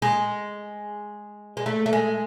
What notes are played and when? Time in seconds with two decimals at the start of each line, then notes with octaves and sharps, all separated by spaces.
0.02 G#3
1.57 G#3
1.66 A3
1.86 A3
1.93 G#3